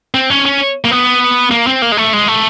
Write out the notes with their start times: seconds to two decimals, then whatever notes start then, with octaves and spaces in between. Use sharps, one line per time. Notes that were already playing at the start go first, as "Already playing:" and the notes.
0.14 C4
0.30 C#4
0.45 C#4
0.85 A#3
0.91 B3
1.51 A#3
1.67 C4
1.82 A#3
1.92 G#3
1.97 A3
2.13 G#3
2.28 A3